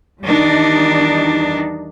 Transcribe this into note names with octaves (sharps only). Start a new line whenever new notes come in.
E2 D#3 G3 D4 D#4